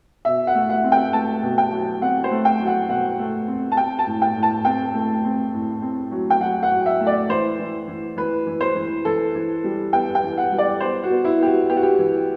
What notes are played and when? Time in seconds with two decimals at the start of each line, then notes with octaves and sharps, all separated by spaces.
0.25 B2 E5
0.47 F#5
0.55 A3
0.69 F#5
0.84 C4
0.92 G5
1.13 A3 A5
1.43 B2
1.58 G5
1.72 F#3
2.01 C4 F#5
2.24 C5
2.31 A3
2.45 G5
2.60 F#3
2.67 F#5
2.89 B2 F#5
3.19 A3
3.48 C4
3.72 A5
3.77 C4 G5
3.99 A5
4.06 A2
4.22 G5
4.36 A2
4.43 A5
4.65 C4 G5
4.94 A3
5.24 C4
5.53 A2
5.82 C4
6.11 F#3
6.30 G5
6.41 F#3 F#5
6.63 F#5
6.71 F#3
6.86 E5
7.00 A3
7.07 D5
7.29 E3 C5
7.59 E3
7.88 E3
8.17 E3 B4
8.47 E3
8.61 C5
8.75 E3
9.05 E3 A4
9.35 E3
9.64 G3
9.93 B3 G5
10.15 G5
10.23 E3
10.38 F#5
10.52 G3
10.58 D5
10.80 B3 C5
11.04 F#4
11.10 B3
11.25 E4
11.40 B3 G4
11.46 F#4
11.69 B3 G4
11.77 F#4
11.83 G4
11.99 E3